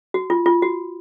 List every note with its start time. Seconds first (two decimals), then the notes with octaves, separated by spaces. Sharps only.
0.14 F#4
0.30 F4
0.46 F4
0.62 F#4